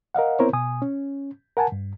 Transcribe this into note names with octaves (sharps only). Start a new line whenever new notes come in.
A#4 D#5 F5 F#5
B3 C4 E4 A#4 C5 C#5
B2 G#5 D#6
C#4
A#4 F#5 G#5 A5
G2